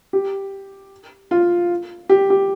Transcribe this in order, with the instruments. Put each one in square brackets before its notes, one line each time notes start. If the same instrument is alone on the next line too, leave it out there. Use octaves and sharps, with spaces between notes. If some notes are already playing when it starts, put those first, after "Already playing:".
[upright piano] G4
F4
G4
G4